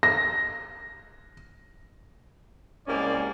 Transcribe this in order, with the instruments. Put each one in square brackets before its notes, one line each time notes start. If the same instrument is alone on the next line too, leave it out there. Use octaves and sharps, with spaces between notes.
[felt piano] A#6
[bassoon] C2 [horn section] G#3 A#3 C#4 [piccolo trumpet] D5